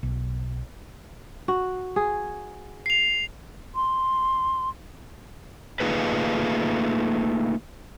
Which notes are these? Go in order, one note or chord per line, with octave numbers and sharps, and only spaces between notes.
B1
F#4
G#4
C7 F7
C6
A3 A#3 D#4 F4 G#4 B4